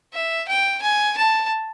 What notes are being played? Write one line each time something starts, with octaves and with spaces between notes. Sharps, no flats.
E5
G5
G#5
A5